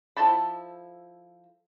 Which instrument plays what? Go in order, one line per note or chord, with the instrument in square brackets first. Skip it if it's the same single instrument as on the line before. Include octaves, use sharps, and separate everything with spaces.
[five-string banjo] F3 E4 A4 A5 B5